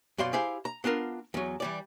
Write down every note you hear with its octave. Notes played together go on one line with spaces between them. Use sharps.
F#2 B2 D5 F5 C6
E4 G4 G#4 C5 F5
A#5
B3 D4 F4 A#4
E2 F#3
E3 G3 D5